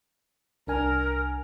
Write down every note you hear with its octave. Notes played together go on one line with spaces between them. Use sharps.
C2 D4 A#4 G#5